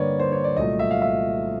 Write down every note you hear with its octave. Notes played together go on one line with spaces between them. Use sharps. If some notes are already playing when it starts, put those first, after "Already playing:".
Already playing: G2 D3 G3 A#3 B4 C#5 D5
C5
C#5
D5
C2 A#2 F#3 A3 D#5
E5
F5
E5